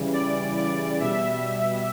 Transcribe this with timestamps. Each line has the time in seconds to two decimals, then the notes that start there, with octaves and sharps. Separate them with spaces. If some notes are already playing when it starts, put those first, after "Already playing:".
Already playing: C#3 E3 G3
0.13 D5
0.56 D5
1.00 B2 G3 E5